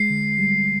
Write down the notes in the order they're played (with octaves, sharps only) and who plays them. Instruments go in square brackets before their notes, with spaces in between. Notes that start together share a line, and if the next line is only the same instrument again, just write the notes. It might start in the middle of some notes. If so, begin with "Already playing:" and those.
Already playing: [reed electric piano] G#3 [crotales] C7
[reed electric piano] D3
G3